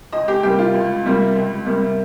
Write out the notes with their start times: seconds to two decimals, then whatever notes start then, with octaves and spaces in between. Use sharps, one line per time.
0.12 C#2 D#5
0.28 G4
0.43 C3 G3 A#3 G4
0.58 F4
0.74 C#2
1.04 C3 G3 A#3
1.36 C#2
1.65 C3 G3 A#3